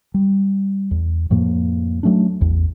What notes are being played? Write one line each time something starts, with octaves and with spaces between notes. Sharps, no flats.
G3
E2
F2 A2 F3 A#3
F#3 A3 C#4 D4
A1 E2